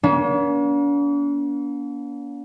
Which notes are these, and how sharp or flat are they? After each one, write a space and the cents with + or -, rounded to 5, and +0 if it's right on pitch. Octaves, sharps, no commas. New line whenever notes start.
A#3 +45 D4 -45